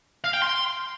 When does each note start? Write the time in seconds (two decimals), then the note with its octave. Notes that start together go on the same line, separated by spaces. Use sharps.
0.24 F5
0.33 G5
0.42 C6